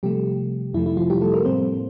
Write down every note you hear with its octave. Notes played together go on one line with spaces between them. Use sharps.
C3 F3 G3 A3 G4
F2 C3 F3 A3 E4
E4
F3 F4
G3 G4
A3 A4
A#3 A#4
A2 G3 A#3 C4 C5